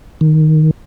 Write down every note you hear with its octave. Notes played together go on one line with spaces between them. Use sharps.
D#3